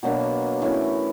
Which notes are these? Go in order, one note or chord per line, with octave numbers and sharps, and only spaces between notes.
B2 F#3 A#3 D4
E3 A3 C#4 E4